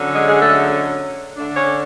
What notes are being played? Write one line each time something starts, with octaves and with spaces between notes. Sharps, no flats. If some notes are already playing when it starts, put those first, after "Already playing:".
Already playing: D3 F#3 C#4
G#3 G#4
G#3 G#4
A3 A4
D3 A3 D4
C#4 C#5